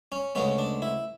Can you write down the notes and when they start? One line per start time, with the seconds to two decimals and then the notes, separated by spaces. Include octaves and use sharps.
0.12 C#4
0.35 D2 C#3 G#3 B3 C#4
0.59 D4
0.82 E4